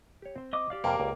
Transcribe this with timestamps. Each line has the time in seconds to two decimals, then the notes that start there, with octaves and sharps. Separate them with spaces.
0.22 G4 C#5
0.36 C4 C5
0.53 D#5 D6 D#6
0.70 G4 D5 F5
0.84 F2 C3 A#3 A#4
1.00 C#2 D#5